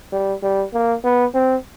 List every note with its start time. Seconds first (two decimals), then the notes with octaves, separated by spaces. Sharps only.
0.12 G3
0.43 G3
0.73 A#3
1.04 B3
1.34 C4